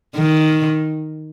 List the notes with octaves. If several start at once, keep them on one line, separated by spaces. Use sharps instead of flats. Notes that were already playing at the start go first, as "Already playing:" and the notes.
D#3